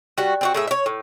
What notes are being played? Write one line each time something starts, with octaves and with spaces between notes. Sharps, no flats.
G3 F#4
C4 D4 F#4
A2 G#4 E5
C#5 E5
A2